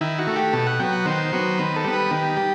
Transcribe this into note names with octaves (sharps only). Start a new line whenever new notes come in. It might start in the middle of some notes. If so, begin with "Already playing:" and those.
D#3 E4
F#4
A3
G4
B2 A4
F#5
F#3 B3 G5
F#5
D#3 C5
F#3 B3
D#3 B4
A4
G3 B3
B4
D#3 G4
G3